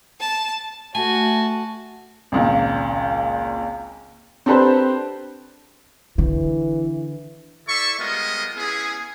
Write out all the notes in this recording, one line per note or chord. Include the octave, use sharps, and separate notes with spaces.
A5
A3 F#4 G#5 A5
G#1 C#2 A#2
C4 D4 G4 A4 B4 C5
D3 E3
E4 A4 D5 E5 C#6
G3 G#3 B3 F4 A#4 D#5
B3 C#4 E4 G#4